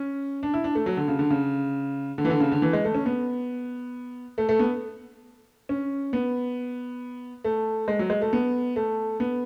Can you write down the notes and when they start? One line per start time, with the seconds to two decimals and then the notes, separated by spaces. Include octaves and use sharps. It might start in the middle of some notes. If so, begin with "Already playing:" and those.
Already playing: C#4
0.43 D4
0.54 E4
0.64 D4
0.75 A3
0.86 F#3
0.97 D3
1.08 C#3
1.19 D3
1.30 C#3
2.18 D3
2.25 E3
2.30 D3
2.40 C#3
2.52 D3
2.62 E3
2.73 G#3
2.85 A3
2.95 C#4
3.06 B3
4.38 A3
4.49 A3
4.59 B3
5.69 C#4
6.13 B3
7.44 A3
7.88 G#3
7.99 F#3
8.10 G#3
8.22 A3
8.33 B3
8.76 A3
9.20 B3